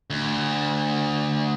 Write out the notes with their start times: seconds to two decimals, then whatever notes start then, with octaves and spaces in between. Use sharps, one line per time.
0.10 D2